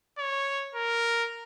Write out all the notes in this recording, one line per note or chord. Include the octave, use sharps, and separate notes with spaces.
C#5
A#4